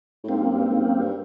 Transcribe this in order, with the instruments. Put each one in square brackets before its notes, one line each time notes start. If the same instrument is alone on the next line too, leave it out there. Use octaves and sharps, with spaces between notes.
[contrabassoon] A2
[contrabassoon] G#2 [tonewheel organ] A#3 C4
[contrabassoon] F#2
G2
G#2
F#2
G2